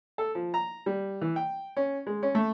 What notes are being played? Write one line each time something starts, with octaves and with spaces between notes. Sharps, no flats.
A4
F3
A#5
G3
E3
G5
C#4
G#3
C#4
A3